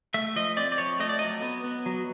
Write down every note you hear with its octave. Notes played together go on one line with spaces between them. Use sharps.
A3 E5
F3 D#5
C4 D5
D5
F3 C#5
A3 D#5
D5
F#3 D#5
B3
B3
F#3